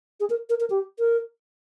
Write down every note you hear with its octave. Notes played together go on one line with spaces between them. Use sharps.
G#4
A#4
A#4
A#4
G4
A#4